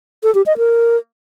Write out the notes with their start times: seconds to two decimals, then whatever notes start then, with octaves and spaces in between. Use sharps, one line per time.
0.23 A4
0.35 G4
0.46 D#5
0.58 A#4